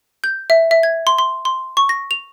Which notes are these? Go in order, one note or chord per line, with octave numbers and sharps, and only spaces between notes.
G6
E5
E5
G#6
C6
C6
C6
C#6
A#6
F7